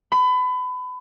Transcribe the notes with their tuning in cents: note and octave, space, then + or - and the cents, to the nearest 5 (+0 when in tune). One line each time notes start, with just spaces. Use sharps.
B5 +30